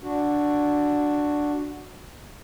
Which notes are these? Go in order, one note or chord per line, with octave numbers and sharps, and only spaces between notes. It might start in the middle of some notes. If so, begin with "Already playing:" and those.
D4 F#4